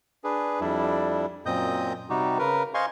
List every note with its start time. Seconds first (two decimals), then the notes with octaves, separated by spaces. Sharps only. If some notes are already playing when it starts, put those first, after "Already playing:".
0.24 D4 G#4 B4
0.61 F2 G3 D4 E4
1.46 F#2 A#2 C4 D#5 D#6 G6
2.10 C3 G3 D#4 F#4 G4
2.39 C#3 A#4 B4
2.74 C5 D#5 F5 G#5 C6 C#6